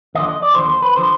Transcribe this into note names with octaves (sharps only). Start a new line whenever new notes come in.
D#2 D3 F3 D#5
D#5
D5
D#2 D3 F3 C5
C5
B4
D3 F3 C5